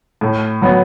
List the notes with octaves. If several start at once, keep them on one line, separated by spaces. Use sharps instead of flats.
A2
F#3 B3 F#4